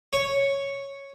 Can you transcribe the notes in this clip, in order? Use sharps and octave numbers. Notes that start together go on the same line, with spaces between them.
C#5